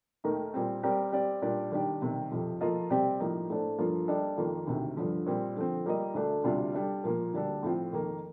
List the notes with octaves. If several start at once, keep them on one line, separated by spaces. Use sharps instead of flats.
D#2 D#3 A3 D#4 A#4
A#2 G3 C4
G3 C4 G4 A#4 D5
G3 C4 G4 D5
A#2 G3 D4 G4 D5
D#3 G3 D4 G4 D5
C3 D#3 G3
F2 C3 F3
F3 A#3 F4 A4 D#5
C3 G3 C4 G4 D5
A2 F3 A#3 D#4
A2 A3 D4 A4 C5
G2 F3 A#3 F4 A4
G3 D4 A4 D#5
F2 D#3 A#3 F4
D2 C3 D#3
G2 D3 F3
A#2 G3 C4
D3 F3 C4
G3 A#3 F4 A#4 D#5
D2 D3 A3 D4 A4
D2 C3 G3 D4 F4
G3 D4 A4 D5
A#2 F3 A#3
D2 D3 G3 D4 A4
A2 F3 C4 F4
F2 D#3 A#3